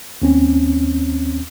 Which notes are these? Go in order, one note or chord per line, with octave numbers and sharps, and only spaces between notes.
D#2 C4 C#4